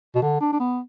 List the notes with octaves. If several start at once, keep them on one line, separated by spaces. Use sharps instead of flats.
B2
D3
D4
D4
B3